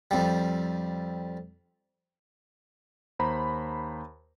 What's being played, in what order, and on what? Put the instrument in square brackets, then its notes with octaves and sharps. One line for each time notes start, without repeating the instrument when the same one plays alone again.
[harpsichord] F2 G3
[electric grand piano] D#2 C5 A#5 B5